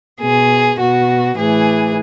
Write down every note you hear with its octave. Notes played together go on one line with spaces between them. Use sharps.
B2 G#4
B2 F#4
A2 E3 G#4